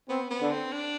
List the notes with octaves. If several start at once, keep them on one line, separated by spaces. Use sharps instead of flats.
B3 C4
B3
D3
C4
D4